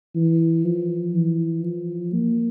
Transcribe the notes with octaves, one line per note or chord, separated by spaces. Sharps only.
E3
F3
E3
F3
A#3